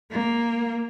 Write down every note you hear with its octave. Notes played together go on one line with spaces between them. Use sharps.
A#3